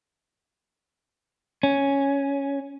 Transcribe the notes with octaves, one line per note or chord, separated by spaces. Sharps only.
C#4